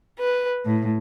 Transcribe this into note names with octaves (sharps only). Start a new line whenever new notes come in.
B4
A2